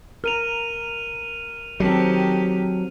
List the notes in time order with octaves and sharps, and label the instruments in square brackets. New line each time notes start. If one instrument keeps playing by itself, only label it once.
[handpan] A#4 [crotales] F6 D#7 F7
[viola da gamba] D#3 G4 [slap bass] F#3 [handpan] C4 A4